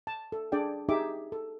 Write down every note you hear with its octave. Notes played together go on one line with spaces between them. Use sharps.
A5
A4
D4 G#4 D5 G5
D#4 G4 G#4 E5 D6
A4